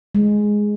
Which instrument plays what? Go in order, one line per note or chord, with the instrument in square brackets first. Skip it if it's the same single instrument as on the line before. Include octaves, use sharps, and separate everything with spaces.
[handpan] G#3